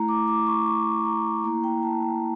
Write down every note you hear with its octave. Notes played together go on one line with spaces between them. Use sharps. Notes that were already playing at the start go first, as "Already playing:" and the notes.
Already playing: A3 E4 A#5
D6
D6
C#6
C#6
A#5
A#3 E4 A#5
G5
A5
G5